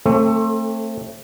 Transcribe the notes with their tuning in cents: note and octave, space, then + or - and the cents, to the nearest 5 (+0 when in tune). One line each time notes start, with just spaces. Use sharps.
A3 +25 C4 +35 A4 +0